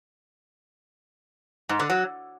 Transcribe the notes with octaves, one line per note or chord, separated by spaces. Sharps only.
G#2
D3
F#3